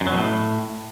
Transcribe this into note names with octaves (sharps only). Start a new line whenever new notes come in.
F#2
F#3
B2
A2